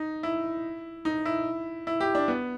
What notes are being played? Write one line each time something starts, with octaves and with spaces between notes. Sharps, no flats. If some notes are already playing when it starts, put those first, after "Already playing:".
Already playing: D#4
E4
D#4
E4
E4
G4
D4
B3